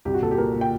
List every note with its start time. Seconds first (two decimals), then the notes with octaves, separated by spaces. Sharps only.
0.05 C2 G4
0.14 F#4
0.22 A#2 A4
0.31 G4
0.38 A#2 A#4
0.55 A#2
0.61 G5